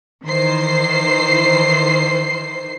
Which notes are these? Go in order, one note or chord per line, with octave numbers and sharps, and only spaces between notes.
D#3 E3 C5 C7